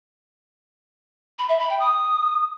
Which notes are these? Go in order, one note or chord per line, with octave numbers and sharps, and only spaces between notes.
B5
E5
B5
G5
D#6